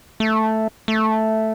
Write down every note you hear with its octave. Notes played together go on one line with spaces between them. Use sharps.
A3
A3